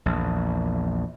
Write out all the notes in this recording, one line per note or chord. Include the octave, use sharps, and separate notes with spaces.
A#1 E2